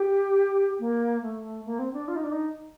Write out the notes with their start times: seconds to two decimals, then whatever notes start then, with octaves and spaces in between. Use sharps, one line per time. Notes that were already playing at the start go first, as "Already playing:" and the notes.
Already playing: G4
0.80 A#3
1.22 A3
1.65 A#3
1.79 C4
1.93 D4
2.08 F4
2.16 D#4
2.24 D4
2.32 D#4